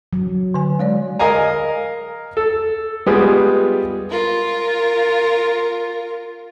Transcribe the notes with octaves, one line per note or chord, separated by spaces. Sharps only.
F#3
D3 G#5
G#3 C#5 D5
A#4 D#5 F5 G#5 A#5
A4
G3 G#3 B3 F4 G#4
F4 A#4